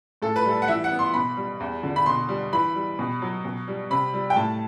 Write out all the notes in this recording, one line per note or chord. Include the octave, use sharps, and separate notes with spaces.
A2 A4
B4
G3 A4
F#5
E3 E5
F#5
B3
C6
B2 B5
G3
E2
D3
B5
B2 C6
G3
E3 B5
G3
B2
F#3
B2
G3
C3 B5
G3
G5
A2 A5